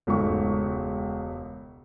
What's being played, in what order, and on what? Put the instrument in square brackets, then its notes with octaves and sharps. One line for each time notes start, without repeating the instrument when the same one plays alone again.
[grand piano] E1 C#2 G#2 A3 C#6